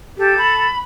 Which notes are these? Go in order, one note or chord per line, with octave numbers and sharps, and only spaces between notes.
G4 A4
B5